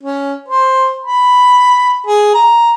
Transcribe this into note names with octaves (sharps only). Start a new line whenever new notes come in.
C#4
C5
B5
G#4
A#5